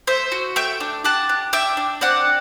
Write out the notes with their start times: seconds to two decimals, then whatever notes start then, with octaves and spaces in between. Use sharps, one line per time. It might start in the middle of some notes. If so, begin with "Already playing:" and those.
0.07 A3 C5 E5
0.32 F#4
0.56 A3 E5 G5
0.80 D4
1.04 G4 F#5 A5
1.29 D4
1.53 D4 E5 G5
1.77 D4
2.01 C4 D5 F#5